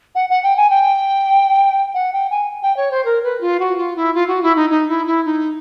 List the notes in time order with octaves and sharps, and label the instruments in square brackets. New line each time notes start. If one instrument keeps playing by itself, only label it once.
[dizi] F#5
F#5
G5
G#5
G5
F#5
G5
G#5
G5
C#5
C5
A#4
B4
F4
F#4
F4
E4
F4
F#4
E4
D#4
D#4
E4
E4
D#4